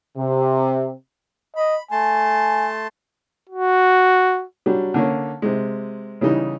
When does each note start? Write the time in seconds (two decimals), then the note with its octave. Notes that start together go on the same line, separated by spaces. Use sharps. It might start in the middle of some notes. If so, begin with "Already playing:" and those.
0.17 C3
1.56 D#5 B5
1.91 A3 G#5 A5 C6
3.49 F#4
4.66 F#3 G3 D4 G4
4.94 D3 A#3 C#4
5.42 C3 G#3
6.21 C#3 E3 G3 D#4